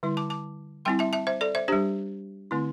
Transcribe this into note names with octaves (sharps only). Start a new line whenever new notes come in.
D3 G3 E4
A5 D6
A5 D6
G3 C4 E4 G5 C6
E5 A5
E5 A5
C5 E5
A4 D5
C5 E5
G3 D4 G4 C5
D3 A3 C4 E4